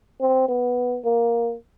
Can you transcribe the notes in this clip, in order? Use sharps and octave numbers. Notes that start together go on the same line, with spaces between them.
C4
B3
A#3